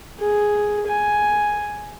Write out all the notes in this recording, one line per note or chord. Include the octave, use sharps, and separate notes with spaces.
G#4
G#5